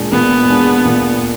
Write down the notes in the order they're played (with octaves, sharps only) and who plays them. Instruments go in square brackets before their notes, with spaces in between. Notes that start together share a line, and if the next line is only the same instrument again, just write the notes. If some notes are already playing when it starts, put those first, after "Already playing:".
Already playing: [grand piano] A#2 G#3 D4 G#4
[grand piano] A#2 [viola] B3
[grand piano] G#3 D4 G#4
A#2